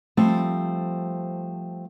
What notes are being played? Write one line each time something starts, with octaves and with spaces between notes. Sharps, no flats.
F3 G3 A3 C4